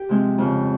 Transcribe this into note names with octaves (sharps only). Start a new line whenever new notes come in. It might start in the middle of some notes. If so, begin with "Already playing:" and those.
Already playing: G4
C3 F3 G#3 C4
F2 C#3 F3